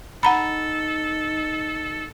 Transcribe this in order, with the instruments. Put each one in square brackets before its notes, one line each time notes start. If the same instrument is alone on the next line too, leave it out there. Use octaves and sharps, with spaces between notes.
[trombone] D#4 [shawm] A4 [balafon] F#5 A#5 B5